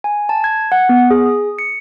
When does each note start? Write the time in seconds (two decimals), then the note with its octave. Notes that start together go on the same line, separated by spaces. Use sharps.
0.04 G#5
0.29 A5
0.44 G#6
0.72 F#5
0.89 B3
1.11 G#4
1.26 D#6
1.59 C#7